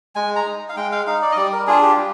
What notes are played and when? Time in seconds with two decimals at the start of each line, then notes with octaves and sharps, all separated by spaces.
0.15 G#3 G#5
0.36 A#5
0.46 D#4
0.69 F5
0.77 G#3 G5
0.92 F5
1.07 D#4 F5
1.22 D5
1.32 D#5
1.37 G3 D5
1.53 A#4
1.67 D4 F4 G#4
1.82 G4
1.97 G3